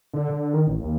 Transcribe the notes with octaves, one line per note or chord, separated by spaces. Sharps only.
D3
D3
D#3
A1
D#2